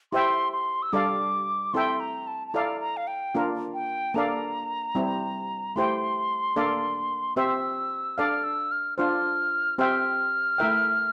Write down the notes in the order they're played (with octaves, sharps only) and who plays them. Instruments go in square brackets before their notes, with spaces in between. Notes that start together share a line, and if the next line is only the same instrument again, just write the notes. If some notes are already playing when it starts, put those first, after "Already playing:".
[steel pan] E4 G4 C5 E5 G5 [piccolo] C6
[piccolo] C6
E6
[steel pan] G3 D4 A4 D5 F5 [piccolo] D6
[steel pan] C4 E4 A4 E5 G5 [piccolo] C6
[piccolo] A#5
A5
A5
[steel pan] E4 A4 D5 F5 [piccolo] A#5
[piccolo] A#5
F5
G5
[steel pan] A#3 D4 F4 A#4
[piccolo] G5
[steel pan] A#3 D4 A4 D5 F5 [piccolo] A#5
[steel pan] G3 C4 E4
[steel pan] A3 E4 G4 C5 G5 [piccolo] C6
[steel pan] A#3 D4 A4 D5 F5
[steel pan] C4 G4 C5 E5 [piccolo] E6
[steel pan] D4 A4 D5 F5 [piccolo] F6
[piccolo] E6
F6
[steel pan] D4 F4 C5 [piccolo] F6
[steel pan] C4 G4 C5 E5 G5 [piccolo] F6
[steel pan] A3 E4 A#4 E5 G5